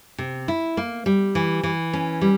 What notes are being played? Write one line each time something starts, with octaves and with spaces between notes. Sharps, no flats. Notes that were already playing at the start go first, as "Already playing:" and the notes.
C3
E4
A#3
G3
E3
E3
C#4
G3